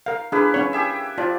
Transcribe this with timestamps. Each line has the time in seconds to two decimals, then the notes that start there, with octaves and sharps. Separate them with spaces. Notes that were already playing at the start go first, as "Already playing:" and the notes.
0.06 A#4 F5
0.32 A#3 D4 E4 G#4 B4
0.54 C#4 C#5
0.73 G4 G#4 E5
1.18 F3 F4 D5